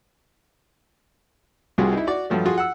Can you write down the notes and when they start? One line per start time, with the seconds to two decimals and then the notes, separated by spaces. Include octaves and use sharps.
1.78 C2 G3 C4 F4 F#4 G#4
1.93 D#4 E4
2.07 F#4 D5
2.30 G2 F3 F#3 A3
2.46 F4 F#4 G#4
2.58 F#5 E6